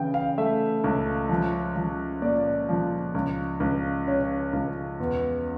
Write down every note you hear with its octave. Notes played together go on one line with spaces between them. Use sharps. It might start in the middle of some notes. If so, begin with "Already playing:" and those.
Already playing: C#3 E3 G5
F5
A3 E5
C#2
F3
F3
A#2 D5
F3
C#2
C#2
C#3 C#5
C#2
E2